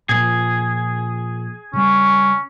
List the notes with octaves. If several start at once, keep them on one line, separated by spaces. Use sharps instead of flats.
A#2 F3 G#4
C#3 G3 C#4